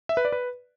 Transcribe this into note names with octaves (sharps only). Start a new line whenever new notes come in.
E5
B4
D5
B4